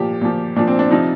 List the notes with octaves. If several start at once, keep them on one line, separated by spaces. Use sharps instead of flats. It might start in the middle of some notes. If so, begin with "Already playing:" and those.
Already playing: A#2 F3 G4
A#2 F3
A#2 F3 D4
C4
D4
C3 F3 D#4